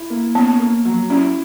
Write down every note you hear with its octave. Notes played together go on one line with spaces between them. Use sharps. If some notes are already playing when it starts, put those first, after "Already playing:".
Already playing: E4
A#3
B3 C#4
A#3
F#3
C#4 E4